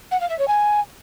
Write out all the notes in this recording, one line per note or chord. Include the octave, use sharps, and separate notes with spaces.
F#5
F5
E5
C#5
G#5